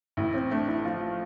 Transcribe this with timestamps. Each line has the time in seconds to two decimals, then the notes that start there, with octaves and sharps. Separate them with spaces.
0.17 A1 E4
0.34 C4
0.51 A3 D4
0.68 E4
0.84 F3 F4